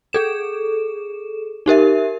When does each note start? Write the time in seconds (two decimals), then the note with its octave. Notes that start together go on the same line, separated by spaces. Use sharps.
0.13 G#4 A4 E7
1.66 D#4 G4 A#4 E5